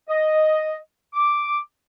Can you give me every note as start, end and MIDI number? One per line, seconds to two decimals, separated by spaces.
0.09 0.77 75
1.14 1.59 86